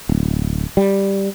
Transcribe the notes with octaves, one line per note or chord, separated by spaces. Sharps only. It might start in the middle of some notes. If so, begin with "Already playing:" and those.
D1
G3